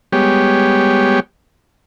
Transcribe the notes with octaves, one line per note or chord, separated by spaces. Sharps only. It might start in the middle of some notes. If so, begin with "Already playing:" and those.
G3 G#3 B3 G4 C#5